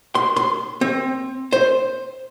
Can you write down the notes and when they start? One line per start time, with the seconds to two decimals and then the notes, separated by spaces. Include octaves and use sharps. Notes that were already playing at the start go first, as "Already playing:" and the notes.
0.15 C6
0.36 C6
0.81 C4
1.53 C5